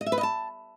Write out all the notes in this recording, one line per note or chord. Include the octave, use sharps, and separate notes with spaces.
D#5
E5
B4
D#5
A5